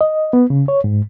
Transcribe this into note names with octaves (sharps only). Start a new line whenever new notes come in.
D#5
B3
C#3
C#5
G#2